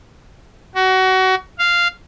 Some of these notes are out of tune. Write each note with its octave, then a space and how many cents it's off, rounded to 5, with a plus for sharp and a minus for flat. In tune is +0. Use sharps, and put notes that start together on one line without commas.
F#4 +25
F5 -5